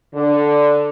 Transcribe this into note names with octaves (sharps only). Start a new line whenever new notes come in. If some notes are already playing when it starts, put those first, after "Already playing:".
D3